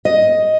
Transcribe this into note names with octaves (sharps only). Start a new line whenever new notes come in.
D#5